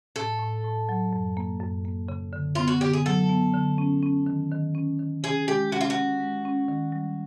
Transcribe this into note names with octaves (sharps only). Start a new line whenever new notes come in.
A2 A4
A2
A2
F#3
F#2
A#3
F#2
A#3
C#3
D3
B3 F4
F#4
D3 G4
G#4
F#3 A4
B3
D3
C#4
C#4
D#3
D#3
C#4
D#3
C#4 G#4
G#3 G4
C#4 F#4
F4
F#4
C#4
G#3
C#4
D#3
G3